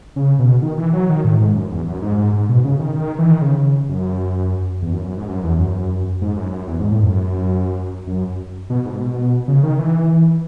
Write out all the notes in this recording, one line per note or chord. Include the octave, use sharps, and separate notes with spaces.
C#3
B2
D#3
E3
F#3
D#3
A2
G#2
F#2
E2
F#2
G#2
G#2
G#2
B2
C#3
D#3
D#3
E3
D#3
C#3
F#2
E2
F#2
F#2
G#2
F#2
E2
F#2
G#2
F#2
F#2
E2
G#2
A2
F#2
F#2
B2
G#2
B2
C#3
D#3
E3